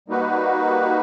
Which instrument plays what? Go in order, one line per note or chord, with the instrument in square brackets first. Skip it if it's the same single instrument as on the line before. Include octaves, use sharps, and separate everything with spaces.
[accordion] G3 A#3 D#4 F#4 B4